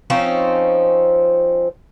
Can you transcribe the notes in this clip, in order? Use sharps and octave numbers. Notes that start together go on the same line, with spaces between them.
F3 C4 C#4 D#4